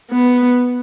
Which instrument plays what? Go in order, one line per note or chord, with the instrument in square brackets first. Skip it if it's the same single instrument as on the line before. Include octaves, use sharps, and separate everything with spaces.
[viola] B3